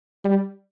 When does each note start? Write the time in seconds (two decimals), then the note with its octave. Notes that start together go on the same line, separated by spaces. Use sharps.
0.25 G3